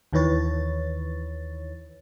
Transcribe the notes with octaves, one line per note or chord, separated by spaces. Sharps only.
D#2 D#3 E3 B4 C#5 A6